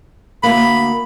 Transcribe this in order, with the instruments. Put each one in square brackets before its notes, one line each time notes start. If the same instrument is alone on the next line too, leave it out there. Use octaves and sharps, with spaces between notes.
[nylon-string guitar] D2 A#3 [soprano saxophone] B5